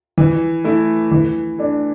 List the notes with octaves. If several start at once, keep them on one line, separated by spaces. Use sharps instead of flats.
E3
A3 E4
E3
A3 D4